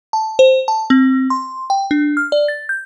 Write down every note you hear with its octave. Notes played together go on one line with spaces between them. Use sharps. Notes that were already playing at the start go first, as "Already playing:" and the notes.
A5
C5
A5
C4
C6
G5
D4
F6
D5
A6
G6